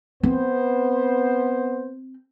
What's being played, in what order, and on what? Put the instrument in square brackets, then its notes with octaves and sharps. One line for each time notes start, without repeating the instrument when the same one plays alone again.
[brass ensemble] B3 C5 [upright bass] C4